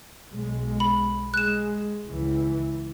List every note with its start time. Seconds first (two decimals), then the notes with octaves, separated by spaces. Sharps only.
0.31 B1 G#3
0.80 B5
1.34 G#3 F#6 E7
2.07 C#2 E3